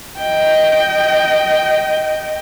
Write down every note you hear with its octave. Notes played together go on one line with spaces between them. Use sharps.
D#5 G5